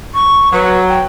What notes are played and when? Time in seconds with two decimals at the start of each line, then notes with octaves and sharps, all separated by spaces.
0.14 C#6
0.52 F#3 B4
0.89 G5